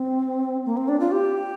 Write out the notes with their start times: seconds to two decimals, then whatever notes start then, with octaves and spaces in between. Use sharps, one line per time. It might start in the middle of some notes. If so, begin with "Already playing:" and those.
Already playing: C4
0.66 A#3
0.77 C4
0.88 D4
1.00 F4
1.12 G4